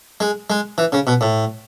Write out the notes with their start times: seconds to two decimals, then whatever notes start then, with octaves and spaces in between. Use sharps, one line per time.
0.20 G#3
0.50 G#3
0.78 E3
0.92 C#3
1.07 B2
1.21 A2